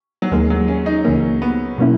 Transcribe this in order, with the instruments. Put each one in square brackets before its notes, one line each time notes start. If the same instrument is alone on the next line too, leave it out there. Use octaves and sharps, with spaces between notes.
[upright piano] F#3
[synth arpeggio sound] D#2 D#3 A#3 [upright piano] G#3
[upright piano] F#3
C#4
D#4
[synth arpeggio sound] C#2 C#3 E3 A#3 [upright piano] C#4
[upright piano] B3
[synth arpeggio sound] B2 F#3 A#3 C#4 E4